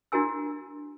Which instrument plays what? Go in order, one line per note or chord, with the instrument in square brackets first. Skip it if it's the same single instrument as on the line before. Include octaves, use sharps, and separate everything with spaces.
[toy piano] D4 E4 F#4 A#4 G#5 E6